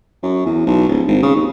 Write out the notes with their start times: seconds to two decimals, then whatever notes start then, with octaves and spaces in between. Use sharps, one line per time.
0.23 F#2
0.46 E2
0.67 B1
0.88 D1
1.08 G#1
1.23 C#3
1.35 D#2